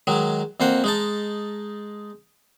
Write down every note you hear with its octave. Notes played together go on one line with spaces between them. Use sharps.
D#3 F#3 G#3
F2 A#3 C5 F#5
G#3 D#4 A5